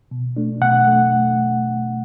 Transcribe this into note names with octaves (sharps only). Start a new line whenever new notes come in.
B2
A3 D4
B2 F#5
A3